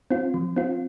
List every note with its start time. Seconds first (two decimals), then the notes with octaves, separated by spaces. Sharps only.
0.11 C4 F4
0.34 F3
0.56 C4 F4